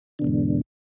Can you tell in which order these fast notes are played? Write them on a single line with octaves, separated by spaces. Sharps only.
D3 B2 E2 G#2